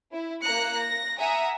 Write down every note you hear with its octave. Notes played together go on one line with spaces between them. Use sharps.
E4
A#3 A#5 F#6 C#7
A#6
E5 F#5 G#5 A#5 D#6